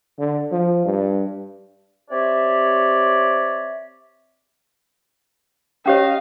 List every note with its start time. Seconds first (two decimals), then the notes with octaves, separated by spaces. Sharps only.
0.18 D3
0.51 F3
0.85 G2
2.11 C4 G4 C#5 D5 E5
5.86 C#4 G4 C#5 D#5 F5